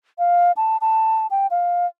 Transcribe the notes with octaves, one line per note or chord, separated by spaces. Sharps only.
F5
A5
A5
G5
F5